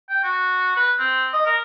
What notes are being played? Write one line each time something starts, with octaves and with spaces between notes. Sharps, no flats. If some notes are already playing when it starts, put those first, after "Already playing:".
G5
F#4
B4
C4
D#5
A#4